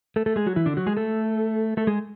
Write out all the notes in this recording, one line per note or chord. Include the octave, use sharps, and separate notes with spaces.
A3 A4
A3 A4
G#3 G#4
F#3 F#4
E3 E4
D3 D4
F#3 F#4
G#3 G#4
A3 A4
A3 A4
G#3 G#4